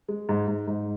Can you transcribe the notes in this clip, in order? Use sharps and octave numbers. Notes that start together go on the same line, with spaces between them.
G#3
G#2
G#2
G#2